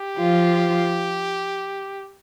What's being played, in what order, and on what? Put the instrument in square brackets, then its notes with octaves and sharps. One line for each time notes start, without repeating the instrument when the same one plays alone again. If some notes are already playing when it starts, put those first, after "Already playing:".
Already playing: [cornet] G4
[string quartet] F3 F4